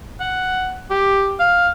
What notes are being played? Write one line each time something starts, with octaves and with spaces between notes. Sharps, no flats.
F#5
G4
F5